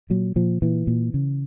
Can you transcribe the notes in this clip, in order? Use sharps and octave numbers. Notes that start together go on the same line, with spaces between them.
A#2 F#3
A#2 F3
A#2 E3
A#2
C#3